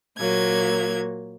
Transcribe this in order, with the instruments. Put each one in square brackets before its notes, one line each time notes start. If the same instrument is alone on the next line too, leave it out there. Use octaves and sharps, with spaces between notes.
[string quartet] A#2 F#3 A#3 G#6